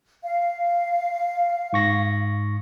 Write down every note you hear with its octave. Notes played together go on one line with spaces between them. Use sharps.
F5
G#2 C#6 A#6